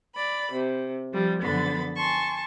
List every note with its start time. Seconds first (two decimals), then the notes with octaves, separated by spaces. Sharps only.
0.15 D5 B5
0.51 C3
1.12 F3 G3
1.41 F#2 D3 F3 B3 B5 A6
1.96 G#5 A5 C6 C#6